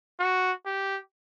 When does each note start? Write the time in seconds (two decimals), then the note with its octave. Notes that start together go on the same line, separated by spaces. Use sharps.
0.19 F#4
0.66 G4